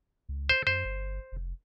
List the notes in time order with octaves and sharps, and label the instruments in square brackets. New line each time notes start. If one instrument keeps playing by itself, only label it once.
[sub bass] C#2
[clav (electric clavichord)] C5
[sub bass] F#2 [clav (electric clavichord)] C5
[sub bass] G1
F1